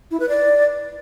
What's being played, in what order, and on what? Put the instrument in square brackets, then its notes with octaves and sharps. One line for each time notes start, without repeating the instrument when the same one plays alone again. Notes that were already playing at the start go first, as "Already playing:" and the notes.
[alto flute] E4
B4
D5